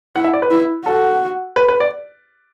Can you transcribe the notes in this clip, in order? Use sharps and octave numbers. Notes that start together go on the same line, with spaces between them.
E4 F#5
E5
D5
B4
E4
F#4 A4
B4
B4
D5